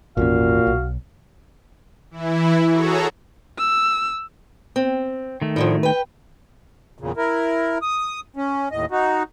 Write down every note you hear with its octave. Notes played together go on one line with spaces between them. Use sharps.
G#1 E2 A#2 C#4 F#4 F5
B1
E3 E4
F#4 G#4 A4 C#5 A#5
E6
C4
D#3 A3
A2 D3 F3
B4 G5
E2 A#2 C#3
E4 A#4
D#6
C#4
D#2 A2 D#5
D#4 F#4